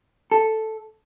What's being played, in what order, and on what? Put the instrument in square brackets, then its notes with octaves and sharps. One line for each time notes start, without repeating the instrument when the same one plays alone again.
[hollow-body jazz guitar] A4